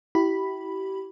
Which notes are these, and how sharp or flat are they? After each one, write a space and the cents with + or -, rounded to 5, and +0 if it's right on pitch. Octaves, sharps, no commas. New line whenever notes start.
E4 +0 G4 -30 B5 +0